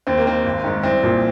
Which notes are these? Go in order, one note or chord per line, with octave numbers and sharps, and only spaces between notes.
D#2 C4
A#3
D#3 C4
G#1
G#2 D#3
C2 C4
A#2 F3